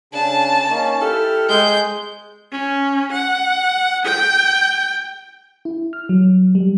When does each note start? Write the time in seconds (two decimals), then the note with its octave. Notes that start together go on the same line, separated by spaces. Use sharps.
0.13 C#3 D4 A5
0.69 A#3 C#4 D#4
1.01 E4 G4 A4 F6
1.49 G#3 G6
2.52 C#4
3.12 F#5
4.05 G5
5.65 E4
5.93 F6
6.09 F#3
6.55 G3